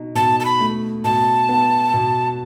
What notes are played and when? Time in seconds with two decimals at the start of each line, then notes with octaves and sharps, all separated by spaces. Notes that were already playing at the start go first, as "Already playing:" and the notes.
Already playing: B2 D#4
0.15 B2 A5
0.40 A5
0.45 B5
0.60 A3
1.04 B2 A5
1.49 B3
1.94 B2